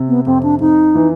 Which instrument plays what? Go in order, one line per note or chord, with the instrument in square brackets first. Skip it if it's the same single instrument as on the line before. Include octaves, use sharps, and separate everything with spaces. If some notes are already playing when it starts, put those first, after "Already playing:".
Already playing: [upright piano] C3
[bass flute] B3
[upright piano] F2 [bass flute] C4
[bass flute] D4
[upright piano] F2 [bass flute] D#4
[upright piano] E3